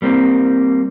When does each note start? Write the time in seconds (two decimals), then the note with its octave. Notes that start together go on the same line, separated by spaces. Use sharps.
0.02 G3 A#3 C4